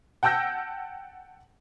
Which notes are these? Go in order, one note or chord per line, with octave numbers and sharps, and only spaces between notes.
F#5 G5 A5 E6 G6 A#6